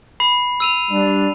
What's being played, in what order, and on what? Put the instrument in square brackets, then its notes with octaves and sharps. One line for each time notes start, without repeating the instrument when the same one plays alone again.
[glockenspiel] B5 C7
E6 D#7 F7
[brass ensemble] G3 D4